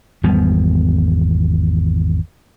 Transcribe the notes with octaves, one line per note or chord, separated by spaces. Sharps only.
G#1 E2 G3 B3